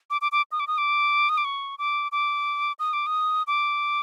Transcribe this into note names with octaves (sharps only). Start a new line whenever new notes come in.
D6
D6
D6
D#6
D6
D#6
D6
D#6
D6
C#6
D6
D6
D#6
D6
D#6
D6